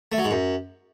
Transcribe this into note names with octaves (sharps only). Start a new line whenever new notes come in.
A3
F#3
G#2
F#2